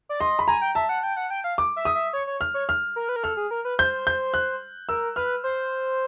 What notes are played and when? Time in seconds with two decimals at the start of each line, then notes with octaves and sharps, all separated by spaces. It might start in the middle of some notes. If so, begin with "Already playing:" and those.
0.09 D5
0.20 D#5 C6
0.39 B5
0.48 G#5 A#5
0.62 G5
0.75 E5 A5
0.89 F#5
1.03 G5
1.17 F#5
1.30 G5
1.44 F5
1.58 D6
1.76 E5
1.85 D#6
1.95 E5
2.13 C#5
2.27 C#5
2.41 F6
2.54 C#5
2.69 F6
2.96 A#4
3.09 B4
3.16 A#4
3.23 A4 F6
3.37 G#4
3.51 A#4
3.65 B4
3.79 C5 G6
4.07 G6
4.34 F#6
4.89 A#4 E6
5.16 B4 F6
5.44 C5